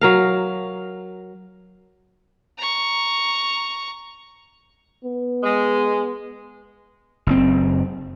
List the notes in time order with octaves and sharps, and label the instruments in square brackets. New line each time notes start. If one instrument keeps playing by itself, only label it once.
[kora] F#3 A#4 F5
[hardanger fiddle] A#5 C#6
[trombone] B3
[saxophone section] G#3
[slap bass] F#1 A2 C4